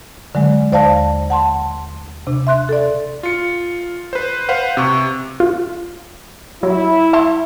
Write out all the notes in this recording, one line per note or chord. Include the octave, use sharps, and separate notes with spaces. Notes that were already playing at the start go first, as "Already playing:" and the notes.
D3 F#3 G#3
D#2 C5 D5 F5 A5 A#6
F#5 A5 C6
C3 D4
E5 C6 F#6
A4 D5
F4 C#7
B4 C5
B4 C5 F5 F#5
C3 C#6
F4
F#3 E4
E5 A5 C6